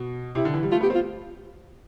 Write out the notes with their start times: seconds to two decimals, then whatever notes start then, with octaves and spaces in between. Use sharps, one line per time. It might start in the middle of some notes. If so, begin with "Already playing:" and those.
Already playing: B2
0.35 C3 E4
0.45 D3
0.54 E3
0.63 G3
0.72 A3 F4
0.81 B3 G4
0.90 C4
0.95 F4